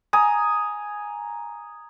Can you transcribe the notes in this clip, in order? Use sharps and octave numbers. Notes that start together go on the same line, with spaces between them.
G#5 A#5 D#6